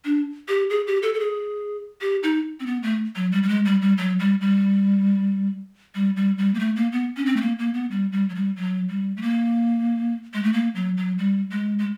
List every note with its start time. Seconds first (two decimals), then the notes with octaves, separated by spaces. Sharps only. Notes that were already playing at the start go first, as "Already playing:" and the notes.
0.05 D4
0.48 G4
0.70 G#4
0.87 G4
1.02 A4
1.14 A4
1.20 G#4
2.01 G4
2.23 D#4
2.60 C4
2.66 B3
2.83 A3
3.16 F#3
3.32 G3
3.43 G3
3.49 G#3
3.65 G3
3.82 G3
3.98 F#3
4.20 G3
4.41 G3
5.95 G3
6.16 G3
6.38 G3
6.54 A#3
6.59 A3
6.76 A#3
6.92 B3
7.17 C#4
7.26 C4
7.36 A3
7.41 A#3
7.59 A#3
7.74 B3
7.91 G3
8.12 G3
8.29 F#3
8.35 G3
8.56 F#3
8.89 G3
9.17 A3
9.22 A#3
10.34 G#3
10.43 A3
10.53 A#3
10.75 F#3
10.97 F#3
11.18 G3
11.51 G#3
11.79 G#3